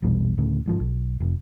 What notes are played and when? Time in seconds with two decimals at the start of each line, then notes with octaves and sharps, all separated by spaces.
0.02 A#1 E2 B2 G3
0.38 D2 A2 C#3
0.66 G1 G#2 F3
0.80 B1
1.20 F1 F2